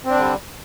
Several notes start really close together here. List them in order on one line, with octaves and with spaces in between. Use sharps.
C4 D4 D3 G3